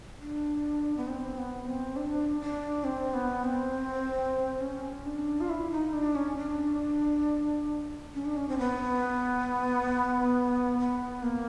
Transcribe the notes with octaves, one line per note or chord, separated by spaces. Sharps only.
D4
B3
C4
B3
C4
D4
D4
C4
B3
C4
C#4
D4
F4
E4
D#4
D4
C#4
D4
C#4
D4
C#4
C4
B3
B3
A#3